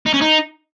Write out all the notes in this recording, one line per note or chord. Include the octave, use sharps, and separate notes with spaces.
D#4
C#4
D#4